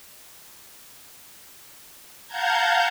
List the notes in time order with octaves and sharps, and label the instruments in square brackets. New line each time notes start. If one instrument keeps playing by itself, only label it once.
[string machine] F5 F#5 A5 A#5 G6 G#6